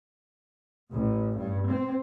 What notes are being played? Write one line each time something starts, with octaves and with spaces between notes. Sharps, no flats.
A1
G2
C4